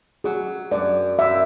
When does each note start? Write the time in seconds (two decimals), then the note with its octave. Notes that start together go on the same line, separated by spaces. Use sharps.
0.24 F#3 G#4
0.72 F#2 D5
1.19 F#2 E5